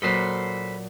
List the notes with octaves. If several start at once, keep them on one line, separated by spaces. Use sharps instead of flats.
A#2 F#3 A4 B4 C5 D#6